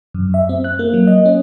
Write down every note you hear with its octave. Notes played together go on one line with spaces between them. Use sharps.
F#2
E5
C4
F#6
A#3
F#3
D#5
C#4